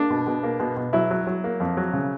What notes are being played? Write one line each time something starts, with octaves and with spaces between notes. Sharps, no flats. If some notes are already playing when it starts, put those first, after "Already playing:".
Already playing: A#3 D4
B2
B2
A#3
B2
B2
F#3 E4
F#3
F#3
A#3
F2
F#3
C#3